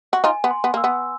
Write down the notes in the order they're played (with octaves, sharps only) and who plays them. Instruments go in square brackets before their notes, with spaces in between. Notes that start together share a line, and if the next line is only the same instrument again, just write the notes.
[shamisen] F#4
[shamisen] D#4 F4 [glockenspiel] G#5
[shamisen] B3
[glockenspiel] C6
[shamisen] B3
[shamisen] A#3 [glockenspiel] E6
[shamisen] B3